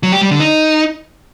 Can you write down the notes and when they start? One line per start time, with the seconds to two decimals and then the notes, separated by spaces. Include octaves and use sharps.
0.03 F#3
0.12 G4
0.21 G3
0.31 D3
0.40 D#4